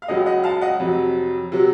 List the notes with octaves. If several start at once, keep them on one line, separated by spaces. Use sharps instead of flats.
F5
C#2 C#3 F#3 D#5 F#5
D#5 F#5
F5 A5
D#5 F#5
F2 C3 F#3
C3 F#3